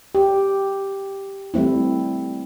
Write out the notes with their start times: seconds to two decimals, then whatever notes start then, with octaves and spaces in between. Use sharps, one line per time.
0.15 G4
1.54 G3 A3 C4 E4